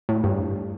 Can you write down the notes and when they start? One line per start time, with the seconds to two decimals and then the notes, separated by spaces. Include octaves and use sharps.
0.09 A2
0.24 G2